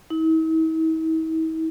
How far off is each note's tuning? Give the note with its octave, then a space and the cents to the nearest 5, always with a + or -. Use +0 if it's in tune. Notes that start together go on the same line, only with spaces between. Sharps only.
E4 -45